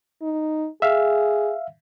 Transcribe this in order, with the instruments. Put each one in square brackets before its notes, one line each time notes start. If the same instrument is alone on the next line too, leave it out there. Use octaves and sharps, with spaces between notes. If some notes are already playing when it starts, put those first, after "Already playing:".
[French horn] D#4
[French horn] G#4 [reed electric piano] E5 F5